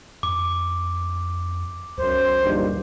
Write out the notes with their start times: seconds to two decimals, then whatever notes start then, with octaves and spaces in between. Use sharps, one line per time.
0.23 F2 D6
1.98 C#2 F#2 C5
2.43 A#1 G2 D#3